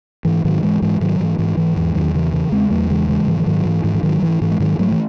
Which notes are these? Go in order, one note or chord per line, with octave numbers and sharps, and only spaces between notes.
G#2 E3
G#2 D#3 F#3
G#2 E3 G#3
G#2 E3 G#3
G#2 D#3 F#3
G#2 E3
G#2 E3
G#2 E3
E2 E3
E2 D#3 F#3
C#3 E3
C#3 E3
E2 G#3 C4
E2 F#3 A3
C#3 E3 G#3
C#3 E3 G#3
G#2 E3
E3
G#2 D#3 F#3
G#2 E3
G#2 E3
E3
G#2 D#3 F#3
G#2 E3
G#2 E3
G#3
G#2 D#3 F#3
G#2 F#3 A3
E3